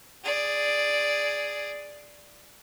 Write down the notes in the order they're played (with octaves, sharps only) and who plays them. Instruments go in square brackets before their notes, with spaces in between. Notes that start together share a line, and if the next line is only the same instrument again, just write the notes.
[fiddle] G#4 D5